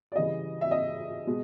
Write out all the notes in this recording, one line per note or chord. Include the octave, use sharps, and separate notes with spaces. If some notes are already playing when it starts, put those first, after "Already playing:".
D5
C#3 E3 G3 D#5
E5
D#5
B2 G#3